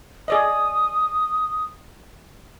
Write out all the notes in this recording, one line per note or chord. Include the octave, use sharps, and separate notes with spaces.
G#4 D5 D#5 D#6